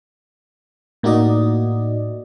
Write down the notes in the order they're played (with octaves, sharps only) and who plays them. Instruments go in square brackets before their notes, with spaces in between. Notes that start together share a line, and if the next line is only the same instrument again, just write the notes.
[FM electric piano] A2 A#3 D#4 F#4 D5 D#5